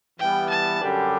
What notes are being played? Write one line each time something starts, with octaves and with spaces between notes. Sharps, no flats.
E3 G3 B3 G5
A5
F#2 D3 G3 D4 G4